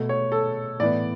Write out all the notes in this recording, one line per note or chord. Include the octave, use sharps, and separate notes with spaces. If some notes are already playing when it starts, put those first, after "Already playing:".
Already playing: B2 A3
C#5
A4
A2 E3 B3 D5